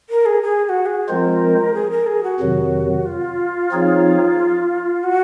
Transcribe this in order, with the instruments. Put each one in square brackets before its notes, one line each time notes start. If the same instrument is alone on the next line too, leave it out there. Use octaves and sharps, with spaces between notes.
[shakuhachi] A#4
G#4
G#4
G#4
F#4
G#4
[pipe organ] F3 G#3 C4 F4 C5 [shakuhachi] A#4
[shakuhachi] G#4
A#4
G#4
F#4
[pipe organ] F2 C3 D#3 F#3
[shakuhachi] F4
[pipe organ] F3 C4 D#4 G#4 C#5
[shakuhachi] F#4